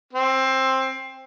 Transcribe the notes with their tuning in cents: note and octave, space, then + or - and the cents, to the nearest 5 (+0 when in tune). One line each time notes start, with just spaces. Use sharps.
C4 +15